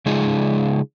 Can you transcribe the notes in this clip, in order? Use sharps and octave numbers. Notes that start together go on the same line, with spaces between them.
C#3 G#3 D#4 F4 G#4